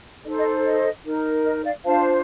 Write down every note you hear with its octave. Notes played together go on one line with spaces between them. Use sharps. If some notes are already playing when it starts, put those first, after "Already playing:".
D#4 A4 C5 D5
D#5
D#5
D#4 A#4
D#5
D5 F5
D4 F4 C5 F5 A5